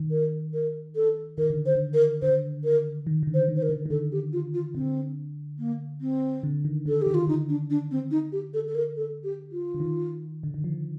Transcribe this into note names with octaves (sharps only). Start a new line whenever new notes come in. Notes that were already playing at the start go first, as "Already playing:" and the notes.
Already playing: D#3
A#4
A#4
A4
D#3 A#4
D3
C5
D3
A#4
D3 C5
A#4
D#3
D#3
D3
C5
D#3
C5
A#4
D3
D#3
D3 A4
G4
F4
F4
D3 C4
A#3
C4
D3
D#3
D3 A4
D#3 G4
F4
D3 D#4
D4
D4
C4
D#4
G4
A4
A4
A#4
A4
G4
F4
D3
D#3
D3
D#3
F3